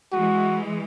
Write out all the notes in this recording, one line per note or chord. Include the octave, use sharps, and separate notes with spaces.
E3 G#3 F#4